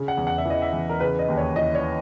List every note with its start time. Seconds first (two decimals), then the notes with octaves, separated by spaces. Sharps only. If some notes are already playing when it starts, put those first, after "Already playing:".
Already playing: C#3
0.08 F#5
0.17 E2
0.27 F#5
0.38 E5
0.45 E3 D#5
0.62 E5
0.73 E2
0.89 A#4
1.00 C#3 B4
1.19 D#5
1.28 D#2
1.37 C#5
1.56 E3 D#5
1.75 C#5